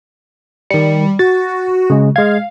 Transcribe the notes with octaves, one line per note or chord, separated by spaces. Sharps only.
D#3 G3 C#7
F#4 A6
C#3 G#3
G#3 F5 G#6